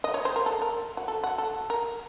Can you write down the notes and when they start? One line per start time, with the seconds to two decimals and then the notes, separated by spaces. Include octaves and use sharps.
0.04 D#5
0.14 C#5
0.25 C5
0.36 A#4
0.46 A4
0.62 A#4
0.97 F#4
1.08 A4
1.24 F#4
1.38 A4
1.70 A#4